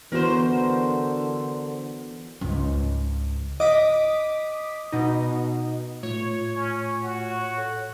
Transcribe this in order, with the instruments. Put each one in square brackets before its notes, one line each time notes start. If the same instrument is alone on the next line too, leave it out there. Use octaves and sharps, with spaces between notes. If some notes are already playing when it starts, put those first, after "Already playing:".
[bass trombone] D3 [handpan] E3 B3 F#4 [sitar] A#4 C5
[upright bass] C#2 G#2
[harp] D#5 [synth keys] D6 D#6 B6
[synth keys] B2 D#4
[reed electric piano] A2 [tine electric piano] A3 F4 [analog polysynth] C#5
[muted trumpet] C#4
F#4
[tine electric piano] A4 F#5